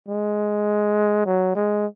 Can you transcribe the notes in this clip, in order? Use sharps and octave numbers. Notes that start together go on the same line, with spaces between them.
G#3
F#3
G#3